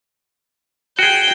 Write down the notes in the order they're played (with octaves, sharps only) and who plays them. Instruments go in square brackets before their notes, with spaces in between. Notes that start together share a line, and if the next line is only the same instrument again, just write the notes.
[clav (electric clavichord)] F#4 G#4 [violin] G5